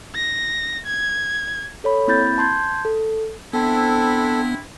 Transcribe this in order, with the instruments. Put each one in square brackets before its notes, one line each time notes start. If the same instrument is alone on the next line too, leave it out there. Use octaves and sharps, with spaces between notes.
[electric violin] A#6
G#6
[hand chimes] A4 C#5 B5
A#3 C4 E4 B5 G6 A6
A5 C6 G6 G#6
A4
[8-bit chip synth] B3 [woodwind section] C4 D4 E4 [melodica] A4